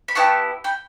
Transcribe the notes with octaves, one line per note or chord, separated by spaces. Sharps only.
B5
B3 E4 G4 A5 C#6
G5 B5